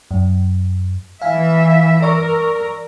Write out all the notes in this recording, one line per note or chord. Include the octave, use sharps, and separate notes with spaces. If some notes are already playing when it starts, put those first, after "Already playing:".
F#2
E3 E5 F5 G#5
A#4 D5 C#6 E6